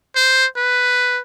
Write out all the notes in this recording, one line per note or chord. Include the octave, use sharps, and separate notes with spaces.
C5
B4